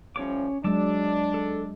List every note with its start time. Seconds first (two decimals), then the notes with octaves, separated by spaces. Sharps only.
0.16 A2 F3 G3 C#4 C#5 D6
0.64 F#3 G#3 D4 A5 D6 E6
1.34 A4